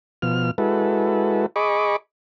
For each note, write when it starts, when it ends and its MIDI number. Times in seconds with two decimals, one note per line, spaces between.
0.22 0.51 47
0.22 0.51 53
0.22 0.51 89
0.58 1.46 56
0.58 1.46 64
0.58 1.46 66
0.58 1.46 69
0.58 1.46 71
1.56 1.96 68
1.56 1.96 75
1.56 1.96 83
1.56 1.96 85
1.56 1.96 86